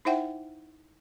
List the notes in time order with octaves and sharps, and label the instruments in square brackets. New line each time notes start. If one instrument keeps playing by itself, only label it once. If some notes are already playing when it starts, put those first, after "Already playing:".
[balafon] D#4 E4 C5 E5 F#5 G5